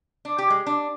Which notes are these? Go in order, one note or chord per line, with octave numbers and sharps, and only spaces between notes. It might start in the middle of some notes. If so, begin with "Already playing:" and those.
D4
G4
G#3
D4